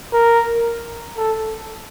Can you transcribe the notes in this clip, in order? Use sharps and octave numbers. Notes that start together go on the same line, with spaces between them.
A#4
A4